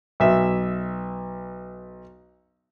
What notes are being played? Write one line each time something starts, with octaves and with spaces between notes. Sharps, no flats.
B1 E5